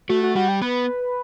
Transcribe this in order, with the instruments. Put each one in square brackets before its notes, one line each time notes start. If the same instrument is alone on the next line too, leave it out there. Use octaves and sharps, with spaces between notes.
[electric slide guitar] A3 [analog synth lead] F#4
[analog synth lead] F#4
[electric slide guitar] G3 [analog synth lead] F#4
[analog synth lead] G4
[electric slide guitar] B3 [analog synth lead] B4